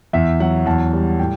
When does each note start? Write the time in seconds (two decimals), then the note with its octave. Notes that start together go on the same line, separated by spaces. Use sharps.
0.13 E2 E5
0.40 F#3 F#5
0.66 E2 A5
0.93 G3
1.19 A2 G5